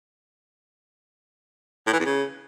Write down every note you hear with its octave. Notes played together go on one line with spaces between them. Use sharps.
A2
E3
E2
C#3